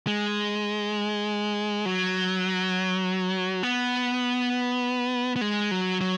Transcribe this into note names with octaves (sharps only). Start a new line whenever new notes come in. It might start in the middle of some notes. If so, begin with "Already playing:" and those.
G#3
F#3
B3
B3
G#3
F#3
F#3